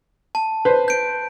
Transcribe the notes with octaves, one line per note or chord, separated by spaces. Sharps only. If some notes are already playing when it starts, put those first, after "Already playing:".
A5
B4 C5
G6 D7